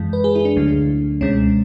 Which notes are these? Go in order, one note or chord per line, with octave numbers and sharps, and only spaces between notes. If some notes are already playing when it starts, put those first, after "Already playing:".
Already playing: F#2 E3 G#3
B4
G#4
E4
D4
D2 D3 F#3 A3
C#2 B2 G#3 C#4